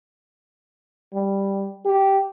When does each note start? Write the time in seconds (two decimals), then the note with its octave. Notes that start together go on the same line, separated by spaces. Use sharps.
1.14 G3
1.85 G4